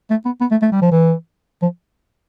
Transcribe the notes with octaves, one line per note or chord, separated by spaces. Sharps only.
A3
B3
B3
A3
A3
G3
F3
E3
F3